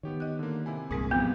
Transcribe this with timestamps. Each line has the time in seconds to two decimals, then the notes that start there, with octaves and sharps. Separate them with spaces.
0.03 D#3 B3 G4 C#5
0.20 D#5 F#6
0.39 D3 A#3
0.66 C3 E4 G#5
0.91 C2 G2 A#2 G#3 A#3 C4 G#4
1.11 C3 E3 F3 B3 F4